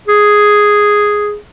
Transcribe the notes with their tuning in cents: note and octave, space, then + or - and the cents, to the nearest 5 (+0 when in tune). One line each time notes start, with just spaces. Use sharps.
G#4 +0